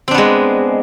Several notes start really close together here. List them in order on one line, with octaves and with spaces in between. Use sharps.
C4 D4 B3 G#3